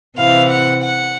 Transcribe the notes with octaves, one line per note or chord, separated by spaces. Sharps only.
C3 E3 F5
F#5
F#5